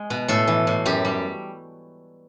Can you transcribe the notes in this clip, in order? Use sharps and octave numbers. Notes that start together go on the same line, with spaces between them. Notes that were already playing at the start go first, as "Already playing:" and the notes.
Already playing: G#3
B2
A2 A4
E3
A2
F#2 G4
G3